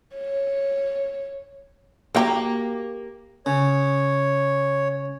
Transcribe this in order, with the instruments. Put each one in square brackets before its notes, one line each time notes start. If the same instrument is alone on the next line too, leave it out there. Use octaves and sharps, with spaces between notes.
[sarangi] C#5
[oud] A#3 G4 [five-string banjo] F#4 G5 A#5
[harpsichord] C#3 [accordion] C#5